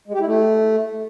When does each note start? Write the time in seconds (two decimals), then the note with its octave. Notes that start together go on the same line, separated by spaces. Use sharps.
0.08 G#3
0.14 G4
0.20 E4
0.26 A3